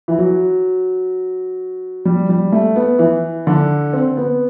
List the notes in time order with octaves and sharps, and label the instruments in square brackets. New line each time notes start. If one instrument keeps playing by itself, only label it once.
[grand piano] E3
F#3
G3
G3
A3
B3
E3
D3
C4
B3